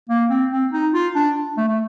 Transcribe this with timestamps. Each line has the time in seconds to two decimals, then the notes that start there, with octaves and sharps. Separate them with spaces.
0.09 A#3
0.30 C4
0.51 C4
0.73 D#4
0.94 F4
1.15 D4
1.57 A3
1.69 A3